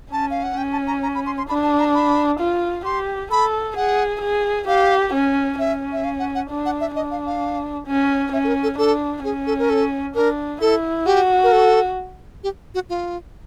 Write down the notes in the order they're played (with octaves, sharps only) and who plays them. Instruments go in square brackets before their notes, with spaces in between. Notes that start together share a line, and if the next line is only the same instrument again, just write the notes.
[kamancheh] C#4 [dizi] A5
[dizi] F5
F#5
[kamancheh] C#4 [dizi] G5
[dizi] A5
A#5
A#5
B5
C6
C6
[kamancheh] D4 [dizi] B5
[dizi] A5
A#5
B5
[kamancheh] F4
[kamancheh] G4 [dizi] C6
[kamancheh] A4 [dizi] B5
[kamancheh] G#4 [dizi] F#5
[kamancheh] G#4
[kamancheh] G4 [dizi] F5
[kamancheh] C#4
[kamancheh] C#4 [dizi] E5
[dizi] E5
F5
F#5
F#5
[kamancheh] D4
[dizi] F#5
E5
[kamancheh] D4 [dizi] D#5
[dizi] F5
F5
[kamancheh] C#4
[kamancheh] C#4 [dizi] E5
[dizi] A4
A#4
A4
[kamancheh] D4 [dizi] A4
[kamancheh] C#4 [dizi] G#4
[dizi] A4
A#4
A4
[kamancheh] D4 [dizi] A#4
[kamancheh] E4 [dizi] A4
[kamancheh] F#4 [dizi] G4
[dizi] A#4
A4
G4
F#4
F4